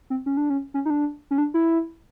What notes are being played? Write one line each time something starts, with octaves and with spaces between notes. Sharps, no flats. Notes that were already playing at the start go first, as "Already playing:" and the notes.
C4
C#4
D4
C#4
C#4
D#4
D4
C#4
D4
E4